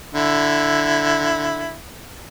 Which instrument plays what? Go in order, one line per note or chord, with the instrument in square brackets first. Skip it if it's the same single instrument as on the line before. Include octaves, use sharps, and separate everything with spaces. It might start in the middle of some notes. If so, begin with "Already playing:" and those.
[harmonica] D3 E4